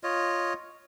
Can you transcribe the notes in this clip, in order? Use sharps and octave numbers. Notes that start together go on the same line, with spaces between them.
F4 C#5 D#5